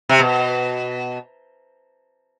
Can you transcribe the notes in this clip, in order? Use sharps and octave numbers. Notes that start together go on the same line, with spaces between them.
C3
B2